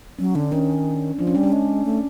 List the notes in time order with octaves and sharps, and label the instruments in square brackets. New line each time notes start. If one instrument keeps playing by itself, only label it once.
[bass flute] F#3 [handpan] C#4
[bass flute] D3 [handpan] D4
[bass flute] D#3 [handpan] C#4
[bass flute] F3 [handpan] D4
[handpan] C#4
[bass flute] G3 [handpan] D4
[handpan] C#4
[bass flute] G#3
A3